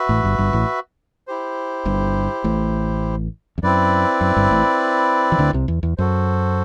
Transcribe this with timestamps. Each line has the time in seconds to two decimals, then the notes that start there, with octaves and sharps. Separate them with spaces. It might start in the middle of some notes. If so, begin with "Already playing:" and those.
Already playing: F#4 B4 E5
0.09 A1 A2
0.24 G1 G2
0.38 G1 G2
0.53 A1 A2
1.27 E4 G4 C5
1.85 G1 G2
2.44 A1 A2
3.58 E2
3.63 F#2 C4 E4 B4 D5
4.21 F#2
4.37 G1 G2
4.51 A1 A2
5.32 E3
5.39 D2 D3
5.53 C2 C3
5.68 E2
5.83 E2
5.98 F#2 F#4 A4 C5